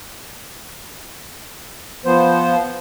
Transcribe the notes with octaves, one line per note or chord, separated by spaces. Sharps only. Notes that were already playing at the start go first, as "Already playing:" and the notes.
F3 B3 C5